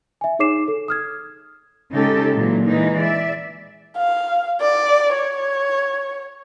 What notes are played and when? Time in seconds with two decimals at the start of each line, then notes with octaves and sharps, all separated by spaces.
0.21 E5 G#5
0.39 D#4 G#4 C#5 D6 C7 E7
0.68 A4
0.88 D#6 F6 G#6
1.91 C#3 G#3 D#4 G4 A4
2.34 A#2 E3 F#3
2.66 E3 G#3 D#4
2.99 D5 E5
3.97 F5
4.61 D5
5.14 C#5